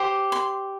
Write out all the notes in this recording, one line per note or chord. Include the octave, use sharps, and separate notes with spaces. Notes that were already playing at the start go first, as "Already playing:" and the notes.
Already playing: G4 C5
C6